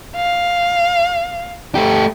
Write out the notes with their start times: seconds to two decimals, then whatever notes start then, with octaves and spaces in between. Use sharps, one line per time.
0.16 F5
1.75 A3 G4